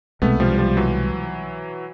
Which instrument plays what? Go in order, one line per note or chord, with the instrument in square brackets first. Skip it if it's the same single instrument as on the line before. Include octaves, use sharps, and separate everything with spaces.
[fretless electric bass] C2 B2 G#3 C4 [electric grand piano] A3 B3
[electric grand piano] F3 G3
F3 G3
E3 F#3